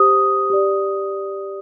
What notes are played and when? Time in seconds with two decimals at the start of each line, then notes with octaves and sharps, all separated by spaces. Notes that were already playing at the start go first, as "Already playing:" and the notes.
Already playing: G4 C5 D#6
0.50 G4 D5